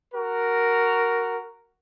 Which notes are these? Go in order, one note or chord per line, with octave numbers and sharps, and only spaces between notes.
F#4 A#4